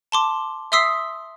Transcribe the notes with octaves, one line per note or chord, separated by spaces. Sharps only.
A5 C6 D6
E5 C6 D#6 E6 B6 C7